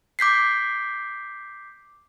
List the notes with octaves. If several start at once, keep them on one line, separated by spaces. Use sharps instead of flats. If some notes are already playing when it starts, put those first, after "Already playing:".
D6 G6 B6 C7